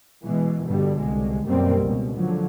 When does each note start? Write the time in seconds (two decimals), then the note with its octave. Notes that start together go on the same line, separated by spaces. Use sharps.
0.24 B2 E3 G#3
0.66 G2 B2 D3 G3
0.99 C2 D3 G#3
1.46 F#2 B2 D#3 G3 A#3 C4
1.82 C#2 B2
2.16 D3 F3 F#3